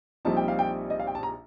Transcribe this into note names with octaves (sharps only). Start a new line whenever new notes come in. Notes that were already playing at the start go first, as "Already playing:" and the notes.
A#1 A#2 G3 C4 D#4 A5
G5
F5
G5
D#5
F5
G5
A5
A#5